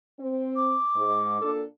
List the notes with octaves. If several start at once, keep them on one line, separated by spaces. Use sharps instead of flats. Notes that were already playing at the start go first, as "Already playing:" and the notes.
C4
D6
G#2
A#2 D4 A4